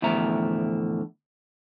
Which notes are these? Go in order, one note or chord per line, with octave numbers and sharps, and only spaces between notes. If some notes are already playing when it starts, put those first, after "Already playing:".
E2 A2 D3 F3 E5 A#5